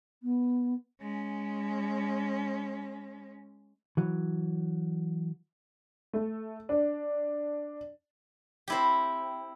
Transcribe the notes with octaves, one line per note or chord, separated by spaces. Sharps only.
B3
G#3 C#4
E3 F#3
A3
D4
C4 E4 G4